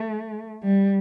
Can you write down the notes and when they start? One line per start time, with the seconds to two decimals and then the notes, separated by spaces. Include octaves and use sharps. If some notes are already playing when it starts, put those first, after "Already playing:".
Already playing: A3
0.64 G3